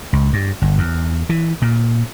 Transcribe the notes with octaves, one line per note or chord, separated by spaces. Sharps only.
C#2
G2
G1
E2
E3
A#2